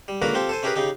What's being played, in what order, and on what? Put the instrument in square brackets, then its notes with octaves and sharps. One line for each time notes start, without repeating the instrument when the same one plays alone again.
[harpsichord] G3
C#2 D3 A#3 F#4 A#4 B4
C4 F4 G4 A4
A4 C5 G#5
C#4 E4 G4 G#4 A#4 B4
C#3 D#4 G4